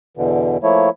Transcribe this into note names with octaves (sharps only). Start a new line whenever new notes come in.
E2 B2 D3 E3
F3 A3 A#3 E4 C#5